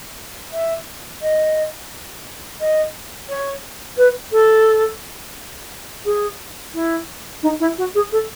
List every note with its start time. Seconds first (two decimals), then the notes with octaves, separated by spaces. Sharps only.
0.53 E5
1.22 D#5
2.60 D#5
3.29 C#5
3.97 B4
4.32 A4
6.05 G#4
6.74 E4
7.43 D#4
7.60 E4
7.78 F#4
7.95 G#4
8.12 A4